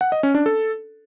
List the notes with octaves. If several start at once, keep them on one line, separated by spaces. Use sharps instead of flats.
F#5
D#5
C#4
D4
A4